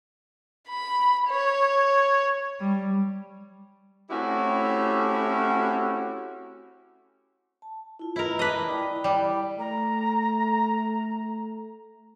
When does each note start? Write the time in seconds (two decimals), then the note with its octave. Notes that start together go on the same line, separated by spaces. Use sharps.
0.68 B5
1.28 C#5
2.60 G3
4.10 A3 C4 C#4 E4 F#4 G4
7.62 A5
7.99 E4 F4
8.16 E4 A#4 B4 D#5
8.39 B4 D#5 A5 D6
8.68 E4 D5 G5
9.04 G3
9.59 A3 A#5